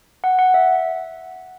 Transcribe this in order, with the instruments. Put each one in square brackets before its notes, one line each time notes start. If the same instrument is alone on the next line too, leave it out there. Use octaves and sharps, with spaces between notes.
[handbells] F#5
F#5
E5